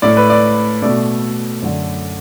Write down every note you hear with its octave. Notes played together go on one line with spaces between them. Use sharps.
A2 A3 D5
B4
D5
B2 A3 D5
F#2 D3 A3